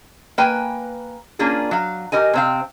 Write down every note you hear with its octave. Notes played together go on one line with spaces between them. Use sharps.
A#3 B4 G5 G#5
A#3 C#4 D4 F4 G#4
F#3 F5
G4 A#4 D#5 G#5
C3 C4 F5